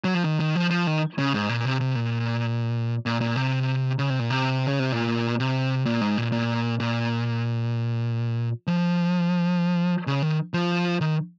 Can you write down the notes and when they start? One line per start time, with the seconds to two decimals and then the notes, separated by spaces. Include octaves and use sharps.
0.04 F#3
0.15 F3
0.24 D#3
0.40 D#3
0.55 F3
0.70 F3
0.87 D#3
1.18 C#3
1.34 G#2
1.49 A#2
1.65 C3
1.81 C3
1.95 A#2
3.06 A#2
3.21 A#2
3.36 C3
3.99 C#3
4.10 C3
4.19 A#2
4.30 C3
4.67 C#3
4.79 C3
4.92 A#2
5.40 C3
5.86 A#2
6.01 G#2
6.18 A#2
6.32 A#2
6.80 A#2
8.67 F3
10.07 C#3
10.22 D#3
10.54 F3
11.01 D#3